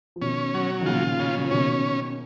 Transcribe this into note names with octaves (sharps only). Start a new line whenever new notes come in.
F3
B2 D#3 C#4
F#3
D#3
A#2 C#3 F4
C#3
F#3
F3
B2 D#3 C#4